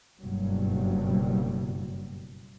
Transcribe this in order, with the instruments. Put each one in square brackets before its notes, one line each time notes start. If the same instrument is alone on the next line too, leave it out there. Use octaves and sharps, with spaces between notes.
[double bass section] F#1 G2 B2 F#3 G3